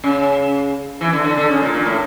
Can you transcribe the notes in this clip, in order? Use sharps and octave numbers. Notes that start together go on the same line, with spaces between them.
C#3
E3
D3
D3
D3
C#3
A#2
A#2
A2